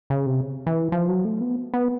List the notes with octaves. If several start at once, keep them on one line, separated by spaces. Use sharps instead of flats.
C#3
C3
E3
F3
F#3
A3
B3
B3